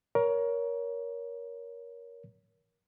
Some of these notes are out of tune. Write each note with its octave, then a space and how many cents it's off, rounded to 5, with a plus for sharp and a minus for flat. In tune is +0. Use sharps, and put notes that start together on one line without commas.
A#4 +20 C#5 +20